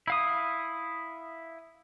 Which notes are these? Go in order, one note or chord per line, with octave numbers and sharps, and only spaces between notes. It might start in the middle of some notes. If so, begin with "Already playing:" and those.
E4 F5 D#6